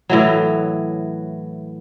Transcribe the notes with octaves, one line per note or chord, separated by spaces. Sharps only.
A2 E3 F#3